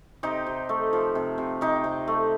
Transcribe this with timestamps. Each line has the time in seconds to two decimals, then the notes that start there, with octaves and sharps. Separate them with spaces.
0.23 C3 D#4 G4
0.46 C3
0.69 A3
0.93 F3
1.15 C3
1.38 C3
1.61 C3 D#4 G4
1.84 C3
2.08 A3